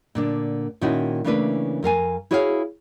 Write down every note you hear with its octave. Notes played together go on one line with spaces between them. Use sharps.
A#2 D3 D4
A#2 D#3 C#4 D#4 E4 F#4
C#3 E3 A3 A#3 D4 B4
F2 A#4 F5 G#5
E4 F#4 G#4 C#5 D5 F5